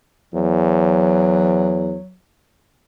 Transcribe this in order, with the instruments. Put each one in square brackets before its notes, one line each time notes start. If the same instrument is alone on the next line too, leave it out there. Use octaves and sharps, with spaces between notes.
[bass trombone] E2 [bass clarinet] F#3